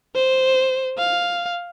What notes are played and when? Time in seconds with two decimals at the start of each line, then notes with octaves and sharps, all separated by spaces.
0.16 C5
0.98 F5